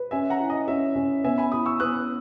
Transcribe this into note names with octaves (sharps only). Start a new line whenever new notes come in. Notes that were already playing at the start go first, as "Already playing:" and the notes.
Already playing: B4
C#4 E5 G#5
F#5 A#5
E4
D#5
C#4 E5
C#4
B3 E5 G#5
G#5 B5
E4 B5 D#6
C#6 E6
B3 D#6 F#6